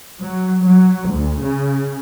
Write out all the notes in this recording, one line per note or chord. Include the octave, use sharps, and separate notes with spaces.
F#3
F#3
D2
C#3